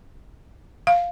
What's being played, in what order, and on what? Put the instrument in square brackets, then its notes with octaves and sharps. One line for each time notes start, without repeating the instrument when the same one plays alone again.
[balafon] F5